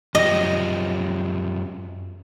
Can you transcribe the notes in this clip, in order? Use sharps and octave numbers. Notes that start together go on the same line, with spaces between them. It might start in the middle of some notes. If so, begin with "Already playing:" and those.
F#2 F3 G4 D#5